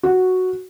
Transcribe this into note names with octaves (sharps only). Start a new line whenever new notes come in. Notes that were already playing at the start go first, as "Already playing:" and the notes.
F#4